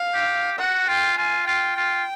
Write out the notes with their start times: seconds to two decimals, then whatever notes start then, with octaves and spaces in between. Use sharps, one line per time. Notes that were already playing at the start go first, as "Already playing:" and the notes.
Already playing: F5
0.14 G4
0.58 F#4 F#5
0.88 F4 G5
1.17 F4 G#5
1.47 F4 G5
1.76 F4